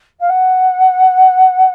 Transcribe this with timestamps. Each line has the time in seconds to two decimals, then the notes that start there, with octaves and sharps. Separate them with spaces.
0.20 F5
0.29 F#5